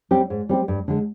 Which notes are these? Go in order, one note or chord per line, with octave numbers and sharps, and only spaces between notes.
G3 C4 G4
G#2
G3 C4 G4
G2
D3 G#3